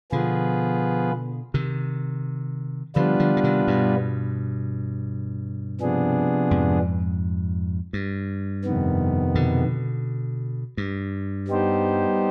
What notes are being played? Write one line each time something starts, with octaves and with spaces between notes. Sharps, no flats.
B2 D3 F3 B3 F4 G#4 B4
C3 D#3
D3 F3 G3 B3 D4 F4 B4
D3 F3
D3
C3 D#3
G2 B2
C3 F3 B3 D4 G#4
F2 G#2
G2
F2 C3 D#3 B3
B2 D3
G2
G3 B3 D#4 G4 C5